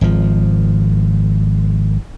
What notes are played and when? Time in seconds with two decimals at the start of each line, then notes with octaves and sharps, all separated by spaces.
0.01 G#1 F3